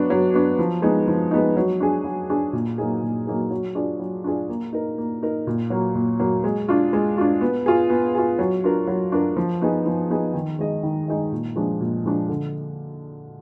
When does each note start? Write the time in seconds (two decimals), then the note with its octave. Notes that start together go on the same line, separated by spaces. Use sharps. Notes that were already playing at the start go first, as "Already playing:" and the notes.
Already playing: F#3 B3 D4
0.10 F#3
0.34 B3 D4
0.59 F3
0.82 G#3 B3 D#4
1.08 F3
1.31 G#3 B3 D#4
1.57 F#3
1.80 D4 G#4
2.05 F#3
2.30 D4 G#4
2.53 A#2
2.78 F#3 A#3 D#4 G#4
3.02 A#2
3.27 F#3 A#3 D#4 G#4
3.51 F#3
3.75 D4 F4 G#4 D5
3.99 F#3
4.24 D4 F4 G#4 D5
4.49 A#3
4.73 D#4 A#4
4.98 A#3
5.22 D#4 A#4
5.47 A#2
5.70 F#3 A#3
5.95 A#2
6.19 F#3 A#3
6.44 G#3
6.68 D4 F4
6.93 G#3
7.18 D4 F4
7.41 B3
7.66 F4 G#4
7.90 B3
8.15 F4 G#4
8.39 F#3
8.64 D4 F4 A#4
8.87 F#3
9.12 D4 F4 A#4
9.37 F3
9.61 B3 D#4 G#4
9.86 F3
10.10 B3 D#4 G#4
10.34 D#3
10.59 G#3 D#4 G#4 D#5
10.83 D#3
11.08 G#3 D#4 G#4 D#5
11.32 A#2
11.56 F3 G#3 D4
11.80 A#2
12.06 F3 G#3 D4
12.29 D3